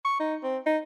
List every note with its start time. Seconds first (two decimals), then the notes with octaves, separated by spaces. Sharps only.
0.05 C#6
0.20 D#4
0.43 C4
0.66 D#4